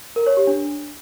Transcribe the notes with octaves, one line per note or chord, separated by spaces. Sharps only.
A#4
C#5
G4
D4